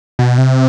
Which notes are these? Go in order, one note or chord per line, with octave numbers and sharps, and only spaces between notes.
B2
C3